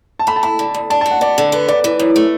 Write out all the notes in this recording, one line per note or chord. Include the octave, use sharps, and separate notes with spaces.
A5
A3 B5
A5
E4 B5
D3
D2
D4 A5
F#4 A5
F#5
B3 D5
D3
B3 B4
F#2 D5
E3 B4
F#2
A3